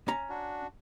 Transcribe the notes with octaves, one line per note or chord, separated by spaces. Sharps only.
C#4 A#5
D4 F#4